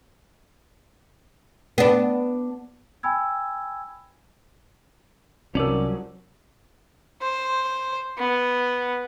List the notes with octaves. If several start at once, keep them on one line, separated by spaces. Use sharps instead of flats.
B3 D4
G5 G#5 B5 E6 G#6
C2 F3 F#3 C#4 D#4 A#4 D5
C5
B3